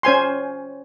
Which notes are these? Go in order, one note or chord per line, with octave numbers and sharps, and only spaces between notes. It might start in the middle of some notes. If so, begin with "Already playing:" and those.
C#4 C5 G#5 C6